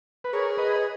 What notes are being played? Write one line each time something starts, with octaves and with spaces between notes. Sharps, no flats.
B4
G#4 A#4 C#5
B4 D#5